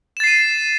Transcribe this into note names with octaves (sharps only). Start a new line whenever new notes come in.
A6 C7 D#7 E7